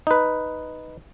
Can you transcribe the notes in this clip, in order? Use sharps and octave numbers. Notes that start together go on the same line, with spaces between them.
D#4 B4